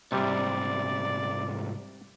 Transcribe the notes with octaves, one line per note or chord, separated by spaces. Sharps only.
C2 G#2 C3 G3 D5